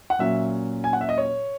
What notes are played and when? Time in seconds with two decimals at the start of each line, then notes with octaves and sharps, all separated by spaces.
0.10 F#5
0.19 A#2 F#3 C#4 E5
0.84 G#5
0.93 F#5
1.01 E5
1.09 D#5
1.18 C#5